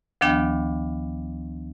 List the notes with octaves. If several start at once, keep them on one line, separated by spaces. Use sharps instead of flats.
D2 D#3 F3 B3 D4 G5